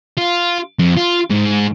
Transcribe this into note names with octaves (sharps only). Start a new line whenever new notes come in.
F4
F2
F4
G#2